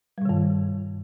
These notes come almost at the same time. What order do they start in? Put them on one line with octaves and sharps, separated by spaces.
G3 B2 D#3 G2